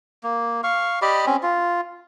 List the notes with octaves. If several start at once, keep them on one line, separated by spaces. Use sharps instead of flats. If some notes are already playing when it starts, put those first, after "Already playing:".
A#3
F5 C#6
G4 D5 D#5 B5
C4 C#4
F4